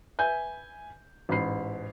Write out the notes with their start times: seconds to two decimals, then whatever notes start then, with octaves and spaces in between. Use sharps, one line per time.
0.19 B4 E5 G#5 G6
1.29 A1 G#2 B5 C7